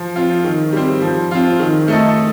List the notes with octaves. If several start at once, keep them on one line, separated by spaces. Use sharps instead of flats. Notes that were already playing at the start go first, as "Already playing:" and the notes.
Already playing: F3
C4 F4
D#3
G3 C4
F3
C4 F4
D#3
A3 D#4 A4